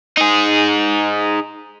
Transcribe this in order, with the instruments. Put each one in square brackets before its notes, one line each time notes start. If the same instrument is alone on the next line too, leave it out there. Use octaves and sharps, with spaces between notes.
[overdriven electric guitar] D#4 G#4